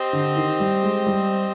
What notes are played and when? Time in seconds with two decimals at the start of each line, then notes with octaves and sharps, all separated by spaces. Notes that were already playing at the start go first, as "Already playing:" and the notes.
Already playing: C4 G4 C5 D#5
0.13 D3
0.36 D#3
0.60 G3
0.83 G#3
1.07 G3